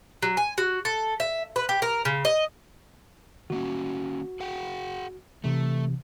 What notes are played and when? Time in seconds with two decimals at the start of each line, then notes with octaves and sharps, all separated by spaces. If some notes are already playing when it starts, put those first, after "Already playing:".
0.22 F#3
0.37 G#5
0.58 F#4
0.85 A4
1.20 E5
1.56 B4
1.69 G4
1.82 A#4
2.05 C#3
2.25 D#5
3.50 D#3 A#3 C#4 F#4
4.40 G#4 F#5 G5
5.44 C3 E3 A3